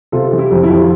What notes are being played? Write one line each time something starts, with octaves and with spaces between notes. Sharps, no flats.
C3 F4 A4
E3
E4 G4
F2
E4 G4
F2
F4